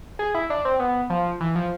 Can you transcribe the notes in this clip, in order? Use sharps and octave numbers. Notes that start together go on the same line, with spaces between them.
G#4
E4
D4
C4
B3
F3
E3
F3